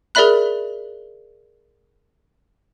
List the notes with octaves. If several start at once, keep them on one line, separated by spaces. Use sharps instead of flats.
G#4 A#4 D5 E5 B5 F#6